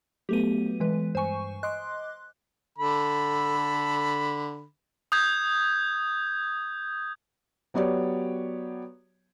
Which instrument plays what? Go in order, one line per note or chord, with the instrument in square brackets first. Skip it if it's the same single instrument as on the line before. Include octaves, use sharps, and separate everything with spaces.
[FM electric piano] F#3 A3 B3 [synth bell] G4 D#7
[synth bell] E3 G#3 B4
[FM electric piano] G2 C#6 [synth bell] C5 G#5
[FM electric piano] D#5 C6 D6 [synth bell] F#6
[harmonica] D3 A4 B5
[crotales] D#6 G6 G#6
[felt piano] F#3 B3 G4 C#5 D5